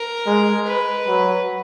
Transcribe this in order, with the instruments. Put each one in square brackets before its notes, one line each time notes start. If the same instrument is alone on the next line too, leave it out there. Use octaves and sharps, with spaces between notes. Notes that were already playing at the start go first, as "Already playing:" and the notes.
Already playing: [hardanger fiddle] A#4
[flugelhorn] G#3
[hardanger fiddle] B4
[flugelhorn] F#3